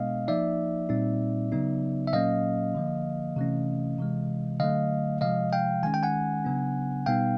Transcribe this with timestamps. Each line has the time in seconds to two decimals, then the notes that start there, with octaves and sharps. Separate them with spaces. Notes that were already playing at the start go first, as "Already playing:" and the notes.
Already playing: B2 G#3 B3 D4 D#5 F5
0.28 F3 A#3 D#4 D5 E5
0.89 A#2 G3 C4 D#4
1.52 C#3 F#3 B3 D#4
2.07 E5
2.12 A#2 F#3 A#3 C#4 D#5 F5
2.75 D3 F3 A#3
3.36 C3 E3 A3 C#4
3.99 C3 E3 G#3
4.60 D3 F#3 A3 D#5 F5
5.21 C3 F3 G#3 D#5 F5
5.53 F5 G5
5.83 D#3 G#3 C#4 G#5
5.94 G5
6.03 F#5 G#5
6.45 C#3 F#3 B3 D4
7.06 B2 G3 B3 D#4 F5 G5